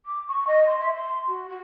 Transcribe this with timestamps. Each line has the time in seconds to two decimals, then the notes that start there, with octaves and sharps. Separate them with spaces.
0.05 D6
0.28 C#6
0.47 D#5
0.67 C6
0.80 E5
0.94 C6
1.27 F#4
1.49 F#4